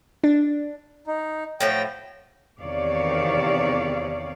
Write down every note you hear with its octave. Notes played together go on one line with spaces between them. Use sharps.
D4
D#4
A2 F3 F#3 G5
E2 C3 D#3 C#5 D5 F5